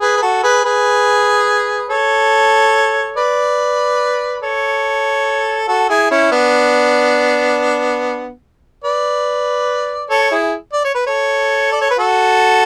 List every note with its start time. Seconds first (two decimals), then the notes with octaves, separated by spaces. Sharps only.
0.01 G#4 B4
0.17 B4
0.22 F#4 A4
0.44 G#4 B4
0.64 G#4 B4
1.90 A4 C#5
3.16 B4 D5
4.43 A4 C#5
5.68 F#4 A4
5.90 E4 G#4
6.11 C#4 E4
6.32 B3 D4
8.84 B4 D5
10.11 A4 C#5
10.31 E4 G#4
10.73 D5
10.85 C#5
10.95 B4
11.07 A4 C#5
11.73 D5
11.81 C#5
11.91 B4
11.99 F#4 A4